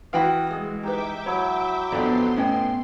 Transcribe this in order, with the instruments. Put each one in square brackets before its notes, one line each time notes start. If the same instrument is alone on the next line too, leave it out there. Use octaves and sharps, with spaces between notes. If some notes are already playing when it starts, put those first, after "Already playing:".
[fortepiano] E3 F#4 F5 [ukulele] B4 G5 B5 [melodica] D#6
[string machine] G#3 [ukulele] E4 G#4
[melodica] D#4 [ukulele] G4 B4 [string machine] E5 G5 D6
[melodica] F#3 E4 [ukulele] C#5
[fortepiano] F2 D3 [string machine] B3 C6 [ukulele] D5
[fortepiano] A2 [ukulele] C#4 D#5 G5